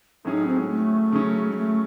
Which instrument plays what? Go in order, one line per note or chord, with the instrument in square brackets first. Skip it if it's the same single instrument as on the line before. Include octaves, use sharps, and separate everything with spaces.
[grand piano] A2 F#3 C#4 G#4 [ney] D#4
[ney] C4
G#3
A3
[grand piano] C#3 F#3 C#4
[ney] G#3
A3